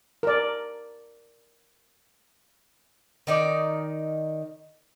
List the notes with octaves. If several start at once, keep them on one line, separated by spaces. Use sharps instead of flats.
A#4 D5
D#3 D#4 D5